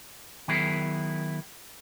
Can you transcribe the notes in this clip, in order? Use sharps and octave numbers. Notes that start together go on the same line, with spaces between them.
D#3 F#3 B3 E4 G#4 A#4